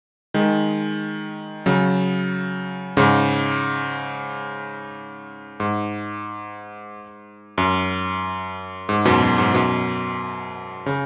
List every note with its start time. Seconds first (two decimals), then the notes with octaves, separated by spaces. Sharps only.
0.34 D#3 G#3
1.66 C#3 F#3
2.97 G#2 C#3
5.60 G#2
7.58 F#2
8.89 G#2
9.05 F#2 B2
9.22 F#2
9.38 G#2
9.54 F#2 B2
10.86 C#3